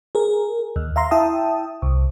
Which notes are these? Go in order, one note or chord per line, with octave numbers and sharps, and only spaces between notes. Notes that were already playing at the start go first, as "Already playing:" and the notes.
G#4 A#4
D#2
E5 F5 A#5 C6
E4 E5 G5 A5 D#6
C2